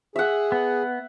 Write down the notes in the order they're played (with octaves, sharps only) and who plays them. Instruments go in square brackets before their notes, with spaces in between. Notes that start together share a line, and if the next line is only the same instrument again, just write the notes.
[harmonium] G#4 [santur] E5 F#5
[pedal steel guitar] B3